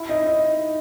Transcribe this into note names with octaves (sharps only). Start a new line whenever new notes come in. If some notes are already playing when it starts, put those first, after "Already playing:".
Already playing: E4
D#4
D#4